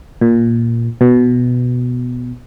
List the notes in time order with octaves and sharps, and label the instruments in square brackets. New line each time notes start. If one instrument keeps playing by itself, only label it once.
[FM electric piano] A#2
B2